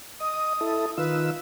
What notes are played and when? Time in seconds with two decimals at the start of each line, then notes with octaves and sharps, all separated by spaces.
0.20 D#5 D#6
0.61 E4 A4
0.98 D#3 F4 B4 E6